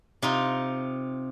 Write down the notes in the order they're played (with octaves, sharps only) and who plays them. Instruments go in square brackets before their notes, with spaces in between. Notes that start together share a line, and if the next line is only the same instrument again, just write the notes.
[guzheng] C3 D#4 F4